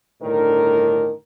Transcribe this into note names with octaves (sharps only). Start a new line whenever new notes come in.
G1 A2 D#3 D4 A#4